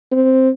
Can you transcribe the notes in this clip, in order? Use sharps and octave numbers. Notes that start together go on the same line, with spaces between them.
C4